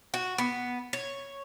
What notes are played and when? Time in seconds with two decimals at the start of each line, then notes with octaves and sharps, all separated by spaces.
0.14 F#4
0.38 B3
0.93 C#5